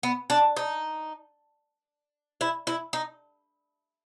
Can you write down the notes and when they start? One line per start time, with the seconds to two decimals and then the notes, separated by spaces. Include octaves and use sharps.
0.03 B3
0.30 D4
0.57 D#4
2.41 E4
2.67 E4
2.93 D#4